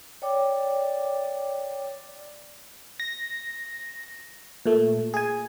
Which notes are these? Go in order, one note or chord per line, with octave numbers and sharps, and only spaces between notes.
C#5 D5 G5 D6
A#6
A#2 A3
G#4 G#5